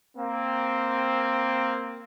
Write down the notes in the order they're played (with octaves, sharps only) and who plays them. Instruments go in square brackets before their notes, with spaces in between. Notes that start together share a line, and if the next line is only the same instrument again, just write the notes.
[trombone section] A#3 C4